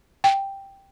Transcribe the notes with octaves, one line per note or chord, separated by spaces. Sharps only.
G5